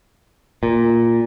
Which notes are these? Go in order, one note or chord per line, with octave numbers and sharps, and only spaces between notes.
A#2